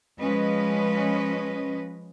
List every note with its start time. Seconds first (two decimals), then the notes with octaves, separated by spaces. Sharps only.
0.19 F3 G#3 C#4 B4 D#5